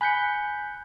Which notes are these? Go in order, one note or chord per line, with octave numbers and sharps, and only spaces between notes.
G#5 B5 F#6 G6 B6 C#7